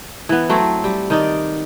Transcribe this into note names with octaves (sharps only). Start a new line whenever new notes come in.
E3 B3
F#3 A3 C4
G3
D#3 D#4 D5